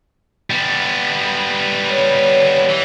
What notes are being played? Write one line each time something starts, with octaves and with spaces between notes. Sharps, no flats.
G3 B3
C#5
E3